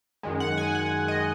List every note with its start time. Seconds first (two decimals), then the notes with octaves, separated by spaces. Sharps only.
0.23 F#2 D#3 G#3
0.40 F#5
0.57 G#5
0.75 F#5
1.08 D#5